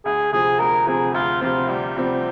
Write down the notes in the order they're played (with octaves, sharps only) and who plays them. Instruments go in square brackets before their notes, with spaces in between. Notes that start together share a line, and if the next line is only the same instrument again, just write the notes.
[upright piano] D2 [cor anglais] G#4
[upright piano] C3 F3 C4 [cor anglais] G#4
[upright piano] D2 [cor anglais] A#4
[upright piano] C3 F3 C4 [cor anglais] G#4
[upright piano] D2 [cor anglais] F4
[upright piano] C3 F3 C4 [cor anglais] F4
[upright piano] D2 [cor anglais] G3
[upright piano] C3 F3 C4